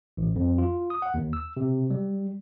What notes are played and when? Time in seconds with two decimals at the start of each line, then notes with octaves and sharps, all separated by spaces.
0.17 A1
0.36 F2
0.58 F4
0.90 D#6
1.02 F#5
1.14 D#2
1.33 E6
1.57 C3
1.90 G3